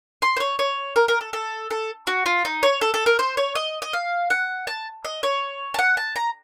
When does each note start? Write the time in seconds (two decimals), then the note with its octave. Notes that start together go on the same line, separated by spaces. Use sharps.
0.22 C6
0.37 C5
0.40 C#5
0.59 C#5
0.96 A#4
1.08 A#4
1.21 A4
1.33 A4
1.71 A4
2.07 F#4
2.26 F4
2.45 D#4
2.63 C#5
2.81 A4
2.94 A4
3.06 A#4
3.19 C5
3.37 C#5
3.55 D#5
3.82 D#5
3.93 F5
4.30 F#5
4.67 A5
5.05 D#5
5.23 C#5
5.74 A5
5.79 F#5
5.97 A5
6.16 A#5